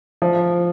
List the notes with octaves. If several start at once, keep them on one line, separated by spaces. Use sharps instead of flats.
F3